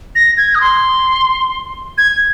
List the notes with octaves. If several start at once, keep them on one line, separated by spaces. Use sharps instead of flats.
A#6
G#6
D#6
C6
G#6